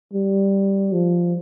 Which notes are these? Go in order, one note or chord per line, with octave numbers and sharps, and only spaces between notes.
G3
F3